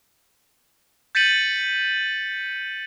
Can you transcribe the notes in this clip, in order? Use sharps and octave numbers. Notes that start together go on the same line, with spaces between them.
G6 A6 B6 C#7 D#7 F#7